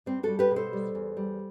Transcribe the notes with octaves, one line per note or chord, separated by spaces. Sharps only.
G3 C4
G3 F#4 A4
G4 B4
B2
A4 C5
G3
E2
G3